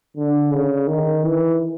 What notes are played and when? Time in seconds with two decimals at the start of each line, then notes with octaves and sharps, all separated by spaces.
0.17 D3
0.52 C#3
0.87 D#3
1.23 E3